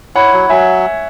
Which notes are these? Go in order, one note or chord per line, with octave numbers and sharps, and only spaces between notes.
E4 C#5 F#5
F#3
F#3 E5 G#5